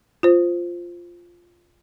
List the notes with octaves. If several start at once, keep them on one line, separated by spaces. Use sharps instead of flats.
F4 C5